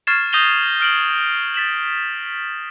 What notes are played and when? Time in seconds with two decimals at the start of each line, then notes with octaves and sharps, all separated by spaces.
0.07 C#6 F6 G#6 A6 C7 E7
0.33 D#6 G6 A#6 D#7 F7 G7
0.80 F6 D7 F#7
1.54 A6 B6 E7 F#7